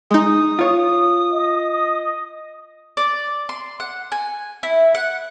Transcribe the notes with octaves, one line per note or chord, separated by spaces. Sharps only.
G#3 D#4 D#6
F4 C#5
D#5
D5
C6
F#5
G#5
E4
F#5